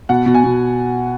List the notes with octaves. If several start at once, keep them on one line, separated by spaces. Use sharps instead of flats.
B2 F#5
B2
G#5
B2